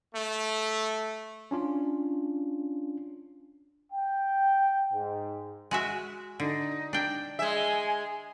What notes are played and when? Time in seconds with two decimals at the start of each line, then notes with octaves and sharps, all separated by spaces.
0.15 A3
1.51 C#4 D4 F4
3.93 G5
4.93 G#2
5.71 G#3 F#4 E5
6.40 D3 D#4
6.93 D4 G5
7.39 G#3 E5 G#5